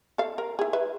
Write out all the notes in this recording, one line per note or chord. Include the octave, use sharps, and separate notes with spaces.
A4 F5
A#4
E4 G#4
B4 E5